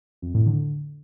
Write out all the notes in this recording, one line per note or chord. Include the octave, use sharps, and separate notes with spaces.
F2
A2
D3